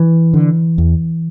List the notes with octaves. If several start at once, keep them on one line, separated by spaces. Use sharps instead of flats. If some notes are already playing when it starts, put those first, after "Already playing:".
Already playing: E3
D3
E2